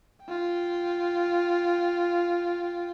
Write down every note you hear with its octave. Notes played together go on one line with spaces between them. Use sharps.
F4 G5